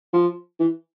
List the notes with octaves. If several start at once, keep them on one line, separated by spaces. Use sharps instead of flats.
F3
E3